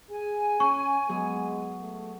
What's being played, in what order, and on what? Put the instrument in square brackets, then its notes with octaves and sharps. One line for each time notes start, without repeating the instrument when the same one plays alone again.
[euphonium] G#4 [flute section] G#5
[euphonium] C#4 [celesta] C#6
[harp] F#3 B3 G#4 [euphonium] G#3
[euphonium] A3